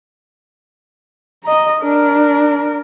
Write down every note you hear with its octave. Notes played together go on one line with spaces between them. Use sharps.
D#5 A#5
D4 A#4